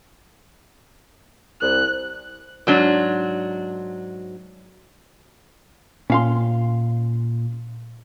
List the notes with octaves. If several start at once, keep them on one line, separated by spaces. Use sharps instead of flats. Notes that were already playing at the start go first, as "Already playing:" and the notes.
C2 F#6
G#2 F#3 D4
A#2 C#4 F5 C6